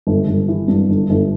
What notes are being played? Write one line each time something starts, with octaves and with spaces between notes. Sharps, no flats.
G1
G1
E3
G2
G1
G1